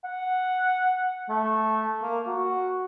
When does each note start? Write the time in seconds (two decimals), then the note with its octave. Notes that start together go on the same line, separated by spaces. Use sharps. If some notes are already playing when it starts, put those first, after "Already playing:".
0.05 F#5
1.30 A3
2.02 A#3
2.27 F#4